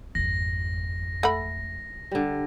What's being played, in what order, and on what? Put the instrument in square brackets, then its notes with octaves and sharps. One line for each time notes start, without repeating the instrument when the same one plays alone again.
[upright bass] G#1 F2 [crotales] A#6
[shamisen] A3 F#5 B5
[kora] D3 G3